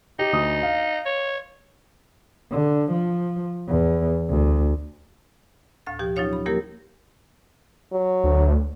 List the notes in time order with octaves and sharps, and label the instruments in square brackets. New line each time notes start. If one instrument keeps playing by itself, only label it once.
[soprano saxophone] D#4 [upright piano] G4
[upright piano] D2 D#6
F5
[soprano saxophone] C#5
[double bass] D3
F3
E2
D2
[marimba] D2 A2 F5 A6
B2 F3 G4 G5
F#3 C#4 D#4 F4 C#5 F5
B5
F3 G3 A#3 E4 G4 A#4
[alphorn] F#3
[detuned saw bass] D2